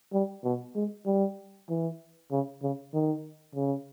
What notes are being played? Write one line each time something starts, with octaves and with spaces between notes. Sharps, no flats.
G3
B2
G#3
G3
E3
C#3
C#3
D#3
C#3